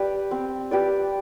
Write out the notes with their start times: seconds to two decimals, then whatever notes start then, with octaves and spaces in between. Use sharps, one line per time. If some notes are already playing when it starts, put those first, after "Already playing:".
Already playing: G4 B4 D5
0.31 C4
0.71 G4 B4 D5